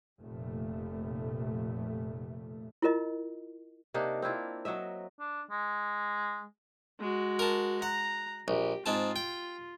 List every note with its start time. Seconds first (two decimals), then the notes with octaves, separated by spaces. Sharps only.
0.21 F1 A#2 A3
2.82 E4 F4 A#4 D#5
3.94 C3 A#3 D4 D#4
4.22 C4 D4 E4 F4
4.65 F#3 F#4 D#5 E5
5.19 D4
5.51 G#3
7.00 G#3 F#4
7.39 A#4 A5
7.82 F#5 A#5
8.48 A#1 G4
8.86 G#2 C4 F4 A5
9.16 G5